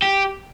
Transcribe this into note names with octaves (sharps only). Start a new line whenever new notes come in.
G4